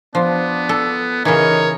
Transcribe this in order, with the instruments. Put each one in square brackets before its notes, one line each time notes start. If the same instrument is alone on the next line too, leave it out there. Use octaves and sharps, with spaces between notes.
[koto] F3 [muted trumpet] B3 [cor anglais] D4
[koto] A4
[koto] C#3 E3 [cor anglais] D#4 [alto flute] A#4 [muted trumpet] C#5